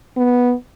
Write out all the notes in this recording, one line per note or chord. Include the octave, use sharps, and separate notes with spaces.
B3